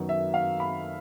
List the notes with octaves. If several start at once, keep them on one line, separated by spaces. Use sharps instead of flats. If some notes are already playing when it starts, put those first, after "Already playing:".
Already playing: F#2 D#3 F#3 B3
E5
F5
B5